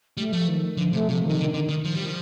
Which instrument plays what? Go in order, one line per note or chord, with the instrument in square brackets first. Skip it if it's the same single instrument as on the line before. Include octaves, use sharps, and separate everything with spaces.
[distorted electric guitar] G3 [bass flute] A3
[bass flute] F3 [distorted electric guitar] A3
[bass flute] D#3
[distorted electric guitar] D3 [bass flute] F3
[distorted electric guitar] C3 [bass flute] A3
[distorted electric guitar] C3 [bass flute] F3
[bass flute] D#3
[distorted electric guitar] C3
[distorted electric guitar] D3 [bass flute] D#3
[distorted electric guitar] D3 [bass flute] D#3
[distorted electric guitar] D#3
[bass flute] D#3 [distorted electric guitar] F3
[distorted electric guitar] G3
[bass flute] D#3
[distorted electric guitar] F3